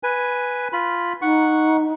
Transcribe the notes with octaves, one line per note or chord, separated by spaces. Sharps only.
B4 G#5
F4 B5
D#4 F#5 C#6